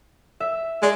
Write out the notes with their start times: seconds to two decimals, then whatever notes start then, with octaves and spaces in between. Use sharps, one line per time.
0.40 E5
0.82 G#3 D5